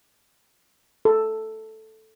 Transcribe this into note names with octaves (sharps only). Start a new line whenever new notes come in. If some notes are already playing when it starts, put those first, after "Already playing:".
A4